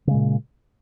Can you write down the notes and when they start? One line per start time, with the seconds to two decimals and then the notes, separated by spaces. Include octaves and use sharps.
0.07 C#3
0.11 G#3
0.14 A#2